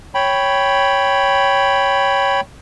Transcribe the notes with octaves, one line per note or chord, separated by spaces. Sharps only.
C#5 G5 B5